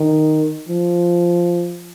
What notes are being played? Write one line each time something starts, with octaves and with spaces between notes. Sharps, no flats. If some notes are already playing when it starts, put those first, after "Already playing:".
Already playing: D#3
F3